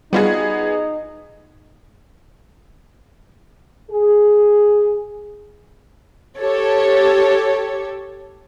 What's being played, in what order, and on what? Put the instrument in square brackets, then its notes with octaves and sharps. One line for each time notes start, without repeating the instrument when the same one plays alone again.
[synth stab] G3 F4 F#4 [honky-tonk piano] B3 G#4 [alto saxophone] D#4
[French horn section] G#4
[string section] G4 A4 C#5